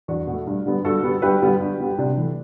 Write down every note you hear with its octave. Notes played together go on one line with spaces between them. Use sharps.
E2 D4 F#4
B2 A3
G2
D3 G3 B3
G2 F#4 A4
D3 G3 B3
G2 G4 B4
D3 G3 B3
G2
D3 G3 B3
C3 D4
E3 A3